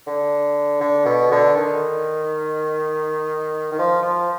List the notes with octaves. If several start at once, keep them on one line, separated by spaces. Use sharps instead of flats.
D3
D3
B2
D3
D#3
D#3
F3
F3